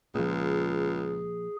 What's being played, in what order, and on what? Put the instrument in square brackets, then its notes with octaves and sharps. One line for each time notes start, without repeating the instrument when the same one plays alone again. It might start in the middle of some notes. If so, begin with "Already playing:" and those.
[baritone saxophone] C#2 [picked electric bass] A#2 F3 [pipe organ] G#4